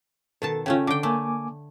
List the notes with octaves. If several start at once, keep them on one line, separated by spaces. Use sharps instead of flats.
B2 D#3 A4 A5
C#3 A3 C#4 F4 G5
D3 G5 D6
A3 A#3 G#5 D6